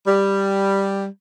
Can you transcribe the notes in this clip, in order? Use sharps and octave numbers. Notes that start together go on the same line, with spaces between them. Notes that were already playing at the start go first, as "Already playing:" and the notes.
G3